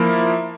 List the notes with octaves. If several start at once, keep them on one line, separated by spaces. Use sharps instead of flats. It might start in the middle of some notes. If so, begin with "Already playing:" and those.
Already playing: F3 A#3 E4